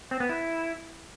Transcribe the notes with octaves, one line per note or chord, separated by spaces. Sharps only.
C4
B3
E4